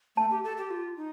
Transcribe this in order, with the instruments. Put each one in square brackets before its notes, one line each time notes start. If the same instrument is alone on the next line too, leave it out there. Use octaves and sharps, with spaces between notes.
[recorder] A3 [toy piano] A5
[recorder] G4
A4
G4
F4
D#4